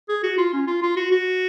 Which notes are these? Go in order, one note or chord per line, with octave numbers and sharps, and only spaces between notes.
G#4
F#4
F4
C#4
F4
F4
F#4
F#4